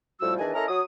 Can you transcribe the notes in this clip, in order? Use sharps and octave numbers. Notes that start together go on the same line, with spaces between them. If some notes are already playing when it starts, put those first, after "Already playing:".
F2 A2 F3 G3 F#4 E6
E2 D#3 E3 D4 D#5 G#5
C#4 E4 A4 A#4 D#5 A#5
F#3 D#6